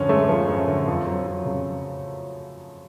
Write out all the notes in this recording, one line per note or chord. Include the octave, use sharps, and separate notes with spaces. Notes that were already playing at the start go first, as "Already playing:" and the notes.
Already playing: F#2 D3 F3 C#4
G#3 A3
F3
F#2
D3
F2
F#3
F2
C#3